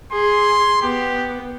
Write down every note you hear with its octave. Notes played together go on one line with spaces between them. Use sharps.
G#4 C6
B3 G4